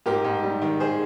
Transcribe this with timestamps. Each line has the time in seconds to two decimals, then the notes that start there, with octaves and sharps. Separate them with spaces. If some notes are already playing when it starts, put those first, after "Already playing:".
0.06 G#2 G4 A#4
0.25 G#2
0.44 G3
0.62 D#3
0.80 G#4 C5